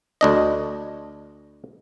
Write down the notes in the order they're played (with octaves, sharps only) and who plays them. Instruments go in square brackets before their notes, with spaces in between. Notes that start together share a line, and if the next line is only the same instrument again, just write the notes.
[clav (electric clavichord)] D2 D4 D#5